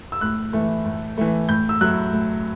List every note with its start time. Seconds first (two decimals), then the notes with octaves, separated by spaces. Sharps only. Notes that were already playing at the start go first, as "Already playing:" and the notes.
0.12 E6
0.21 A2 F#6
0.53 E3 A3
0.85 A2
1.17 E3 A3
1.49 A2 G6
1.69 E6
1.81 F#3 A3 F#6
2.13 A2